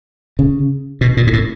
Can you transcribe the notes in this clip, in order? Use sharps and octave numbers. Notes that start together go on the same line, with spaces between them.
C#3
B2
A#2
G#2
A2